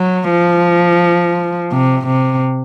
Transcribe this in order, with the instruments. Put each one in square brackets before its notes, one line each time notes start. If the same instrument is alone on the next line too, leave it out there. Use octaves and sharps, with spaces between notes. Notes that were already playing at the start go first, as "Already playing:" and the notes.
Already playing: [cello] F#3
F3
C3
C3